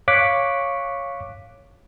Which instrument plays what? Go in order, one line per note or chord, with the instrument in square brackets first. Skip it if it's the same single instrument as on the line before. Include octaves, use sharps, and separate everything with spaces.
[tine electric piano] C#5 F5 C#6 D6 F#6 B6